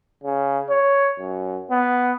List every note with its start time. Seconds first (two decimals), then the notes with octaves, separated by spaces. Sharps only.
0.23 C#3
0.70 C#5
1.19 F#2
1.71 B3